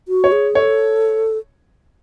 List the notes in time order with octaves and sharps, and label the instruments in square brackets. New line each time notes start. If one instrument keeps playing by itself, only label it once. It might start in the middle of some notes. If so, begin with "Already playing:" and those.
[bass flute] F#4
[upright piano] C#5
[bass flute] G#4
[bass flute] A4 [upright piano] C#5